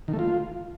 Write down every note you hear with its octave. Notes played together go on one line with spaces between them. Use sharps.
D#3
A3
F4